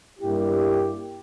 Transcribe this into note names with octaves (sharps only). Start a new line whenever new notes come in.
G2 G3 A#3 E4 G4